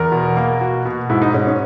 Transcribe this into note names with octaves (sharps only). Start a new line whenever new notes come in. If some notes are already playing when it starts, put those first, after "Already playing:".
Already playing: E2 A#4
B2
A#3
B2 F#4
B2
G#2 E4
D#4
G#2 C#4
C#4